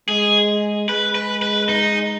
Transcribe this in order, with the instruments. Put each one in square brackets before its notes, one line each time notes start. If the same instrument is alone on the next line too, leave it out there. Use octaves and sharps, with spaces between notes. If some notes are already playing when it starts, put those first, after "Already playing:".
[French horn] G#3 [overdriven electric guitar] G#4
[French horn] G#3 [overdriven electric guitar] B4
[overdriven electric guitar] B4
B4
D#4